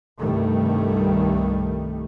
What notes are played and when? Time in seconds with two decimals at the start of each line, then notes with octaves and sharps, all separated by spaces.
0.18 C2 G2 D#3 G3 A3